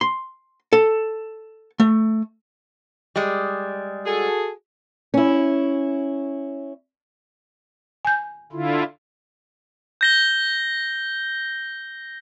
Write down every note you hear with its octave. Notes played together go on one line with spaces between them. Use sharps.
C6
A4
A3
G3 G#3
F#4 G#4 A4
C#4 E4
G#5 G6
D3 E4 F4
G6 A#6 G7